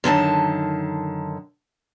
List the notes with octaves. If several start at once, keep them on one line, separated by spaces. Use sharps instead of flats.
F#2 D3 D#3 A5